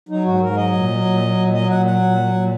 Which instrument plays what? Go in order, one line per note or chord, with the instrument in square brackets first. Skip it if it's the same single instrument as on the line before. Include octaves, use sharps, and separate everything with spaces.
[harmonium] F#3 D#4
G#2 F#4
G#2 A#4
F#3 D#5
A#2
F#3
A#2
F#3
A#2
F#3 D#5
A#2 F#5
F#3 F#5
A#2
F#3
A#2